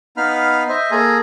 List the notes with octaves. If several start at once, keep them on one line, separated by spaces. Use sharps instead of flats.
B3 D#4 F5 B5 F6
C5 D#5 E5
A#3 G#4 A4 G#5 A#5